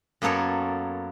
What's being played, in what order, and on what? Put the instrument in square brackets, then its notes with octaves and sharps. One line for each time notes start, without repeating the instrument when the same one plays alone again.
[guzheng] F#2 A#3 B3 A4 C#5